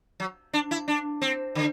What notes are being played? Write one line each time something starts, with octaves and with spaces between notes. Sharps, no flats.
F#3
D4
E4
D4
C4
D3